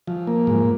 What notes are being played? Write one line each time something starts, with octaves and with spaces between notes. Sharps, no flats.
F3
A#3
G#2